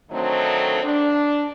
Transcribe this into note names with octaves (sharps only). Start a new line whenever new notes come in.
D3 D#3 F#3 A3 C4 D#4
D4